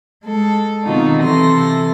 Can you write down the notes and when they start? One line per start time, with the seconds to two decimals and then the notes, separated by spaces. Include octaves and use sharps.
0.24 G#3 A4
0.84 B2 D#3 C4 D#4 F4 F#4
1.23 C3 E3 A4 C6 A#6